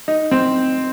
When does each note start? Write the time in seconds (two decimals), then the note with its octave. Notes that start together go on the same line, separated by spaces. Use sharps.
0.08 D#4
0.31 C4